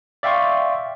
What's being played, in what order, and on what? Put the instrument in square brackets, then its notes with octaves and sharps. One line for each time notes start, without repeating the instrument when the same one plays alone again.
[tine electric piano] D5 E5 F5 G5 C6 C#6